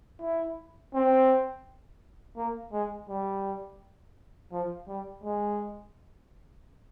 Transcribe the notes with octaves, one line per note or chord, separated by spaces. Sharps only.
E4
C4
A#3
G#3
G3
F3
G3
G#3